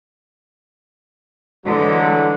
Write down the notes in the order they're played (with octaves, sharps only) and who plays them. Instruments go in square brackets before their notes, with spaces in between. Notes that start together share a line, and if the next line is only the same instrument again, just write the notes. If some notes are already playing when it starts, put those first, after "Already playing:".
[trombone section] D3 F#3 [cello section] E3 G#3 A4